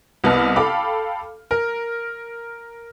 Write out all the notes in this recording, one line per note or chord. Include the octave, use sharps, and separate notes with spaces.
C2 B3 D#5 A5 F6
A4 F5 G5 B5 D6
A#4